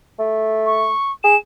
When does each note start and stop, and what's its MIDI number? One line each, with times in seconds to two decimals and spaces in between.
0.19 0.90 57
0.66 1.12 85
1.24 1.36 68
1.24 1.37 100